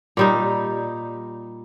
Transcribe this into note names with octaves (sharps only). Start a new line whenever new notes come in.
A#2 G3 D#4